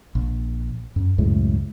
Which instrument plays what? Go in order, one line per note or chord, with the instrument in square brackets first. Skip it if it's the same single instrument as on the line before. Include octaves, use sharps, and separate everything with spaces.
[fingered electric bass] A#1
F#2
C#2 F#2 A2 G#3